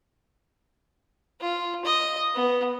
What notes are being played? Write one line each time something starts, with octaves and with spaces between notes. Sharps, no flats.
F4
D#5
B3